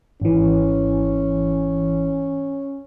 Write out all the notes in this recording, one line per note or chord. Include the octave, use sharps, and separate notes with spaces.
G#1 E3 C#4